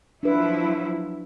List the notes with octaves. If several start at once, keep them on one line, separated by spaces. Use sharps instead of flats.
F3 F#3 D4 E4 B4